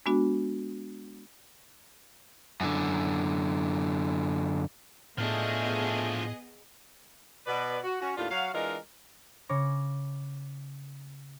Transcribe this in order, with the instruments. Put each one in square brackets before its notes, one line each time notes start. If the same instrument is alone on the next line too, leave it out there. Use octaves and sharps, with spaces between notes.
[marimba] G#3 B3 D4 F#4
[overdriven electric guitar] F#2 D3
[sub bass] A2 [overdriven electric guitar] F3 D4 [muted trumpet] A3 [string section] B3 G#4 D#5
[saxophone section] B2 B4 D5
F#4
C#4 F#4
D#2 A2 D4 F4
F#3 F#4 C#5 F5
E3 G#3 D4 F4 A#4 D#5
[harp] C#3 C#5 D6 A#6